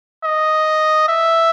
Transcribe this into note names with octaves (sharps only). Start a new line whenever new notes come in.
D#5
E5